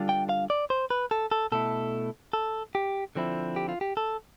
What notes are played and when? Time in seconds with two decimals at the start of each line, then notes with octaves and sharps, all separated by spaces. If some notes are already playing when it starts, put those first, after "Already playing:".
Already playing: D3 G3 D4 F4
0.09 G5
0.29 F5
0.50 D5
0.70 C5
0.90 B4
1.11 A4
1.32 A4
1.52 B2 A3 E4 A4
2.33 A4
2.75 G4
3.15 D3 F3 C4 E4
3.56 G4
3.69 F4
3.81 G4
3.97 A4